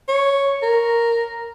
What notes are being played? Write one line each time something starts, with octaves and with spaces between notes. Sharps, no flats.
C#5
A#4